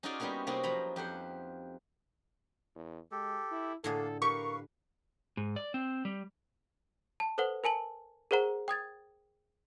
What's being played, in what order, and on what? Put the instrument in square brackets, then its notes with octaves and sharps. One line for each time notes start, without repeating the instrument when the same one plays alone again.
[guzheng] C#4 D#4 F4 F#4 G#4 D5
G3 A#3 B3 C#4 F#4
C3 A#3 C4 D#4 F#4
F3 F#3 A#5 B5
F2 G4 C5 F#5
[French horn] E2
[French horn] G#3 [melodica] G4 A4
[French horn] E4
[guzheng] A2 D3 G#4 [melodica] A#3 D4 F5 [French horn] A4
[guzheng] G4 [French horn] A#4 [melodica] B4 F5 [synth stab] C#6
[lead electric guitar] G#2
D5
C4
G3
[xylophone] A5
A4 B4 C5 F#5
A#4 G#5 A5 F#7
G#4 A#4 C5 F#5 A#5
G5 D#6 G#6 A6